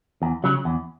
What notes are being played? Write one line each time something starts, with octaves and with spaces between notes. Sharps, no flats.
E2
C#3 F#3
E2